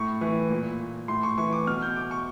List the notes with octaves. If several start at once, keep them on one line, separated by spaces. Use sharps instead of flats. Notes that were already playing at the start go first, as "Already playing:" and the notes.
Already playing: A2 C#6
E3
A#2
A2 C6
C#6
E3 C#6
D6
B2 F6
G6
D6
C#6